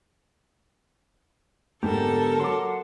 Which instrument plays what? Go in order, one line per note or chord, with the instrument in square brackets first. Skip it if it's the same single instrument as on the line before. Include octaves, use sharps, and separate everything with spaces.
[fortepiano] G#2 [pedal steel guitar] D3 B3 G4 [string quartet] A4 A#4 A5
[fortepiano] F#3 D6 [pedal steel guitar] F#5 C6